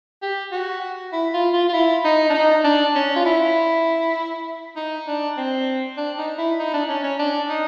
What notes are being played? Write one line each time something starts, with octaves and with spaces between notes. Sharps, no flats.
G4
F#4
E4
F4
F4
F4
E4
D#4
D4
D#4
D4
C#4
F4
E4
D#4
D4
C4
D4
D#4
E4
D#4
D4
C#4
C#4
D4
D#4